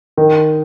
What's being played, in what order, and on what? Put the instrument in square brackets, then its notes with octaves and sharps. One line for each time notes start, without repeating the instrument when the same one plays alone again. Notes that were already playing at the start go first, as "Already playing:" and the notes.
[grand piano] D#3